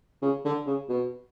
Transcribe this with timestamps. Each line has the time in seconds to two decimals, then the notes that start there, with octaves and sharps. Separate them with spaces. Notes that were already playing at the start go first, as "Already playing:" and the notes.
0.22 C#3
0.45 D3
0.67 C#3
0.89 B2